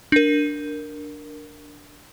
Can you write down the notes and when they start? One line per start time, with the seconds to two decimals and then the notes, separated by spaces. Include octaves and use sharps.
0.12 D4 A#4